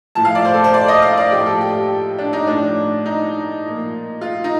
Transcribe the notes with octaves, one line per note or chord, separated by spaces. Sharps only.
A2 F3 A5
F5
D5
C5
A4
C5
D5
D#5
F5
D5
A2 F3 G4
A4
G4
D4
D#4
A2 F3 D4
D#4
F3
A#2
F4
D#4